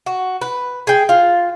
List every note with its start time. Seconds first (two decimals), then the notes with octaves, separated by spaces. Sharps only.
0.06 F#4
0.42 B4
0.87 G#4 G5
1.09 F4